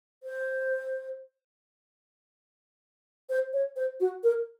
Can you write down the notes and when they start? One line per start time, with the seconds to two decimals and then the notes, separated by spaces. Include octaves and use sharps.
0.23 C5
3.29 C5
3.53 C#5
3.76 C5
4.00 F#4
4.23 A#4